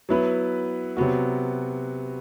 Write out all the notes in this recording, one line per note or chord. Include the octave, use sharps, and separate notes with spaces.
F#3 B3 E4 B4
C3 F#3 B3 F#4